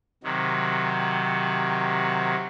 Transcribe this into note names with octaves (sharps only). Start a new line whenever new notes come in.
C3 D#3 F#3